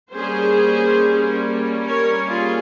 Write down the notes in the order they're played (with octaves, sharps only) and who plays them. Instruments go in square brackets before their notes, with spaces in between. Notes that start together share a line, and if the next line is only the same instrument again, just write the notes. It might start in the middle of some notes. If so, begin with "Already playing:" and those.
[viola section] G3 A#3 C#4 G#4 C5
A#4 C#5
F4 G#4